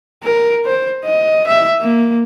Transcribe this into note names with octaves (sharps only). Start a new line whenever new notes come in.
A#4
C5
D#5
E5
A#3